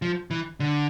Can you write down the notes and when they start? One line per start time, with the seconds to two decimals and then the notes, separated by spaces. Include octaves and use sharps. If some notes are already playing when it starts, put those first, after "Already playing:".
0.02 F3
0.31 E3
0.60 D3